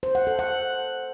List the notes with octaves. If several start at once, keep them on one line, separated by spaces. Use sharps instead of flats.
C5
F#5
A4
F#5